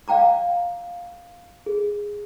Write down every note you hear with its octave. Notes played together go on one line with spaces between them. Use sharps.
D5 F5 G5 A#5 D6
G#4